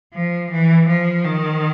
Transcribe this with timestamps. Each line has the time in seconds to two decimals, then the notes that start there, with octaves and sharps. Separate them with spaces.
0.13 F3
0.51 E3
0.88 F3
1.25 D#3